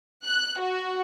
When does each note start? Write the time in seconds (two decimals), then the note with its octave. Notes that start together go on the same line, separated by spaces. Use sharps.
0.25 F#6
0.59 F#4